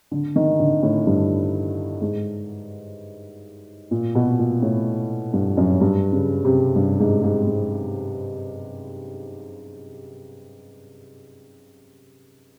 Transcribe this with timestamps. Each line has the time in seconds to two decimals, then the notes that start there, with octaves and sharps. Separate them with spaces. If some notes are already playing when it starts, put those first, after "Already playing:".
0.11 D3
0.36 D#3
0.60 D3
0.83 A2
1.07 G2
2.01 G#2
3.91 A#2
4.15 B2
4.39 A#2
4.62 A2
5.33 G2
5.57 F#2
5.81 G2
6.12 C#3
6.45 C3
6.76 G2
7.00 G#2
7.23 G#2
7.47 G#2